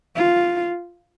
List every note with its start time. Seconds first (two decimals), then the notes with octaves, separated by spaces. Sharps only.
0.16 F4